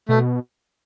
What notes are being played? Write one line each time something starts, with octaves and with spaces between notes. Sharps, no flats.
B2 A3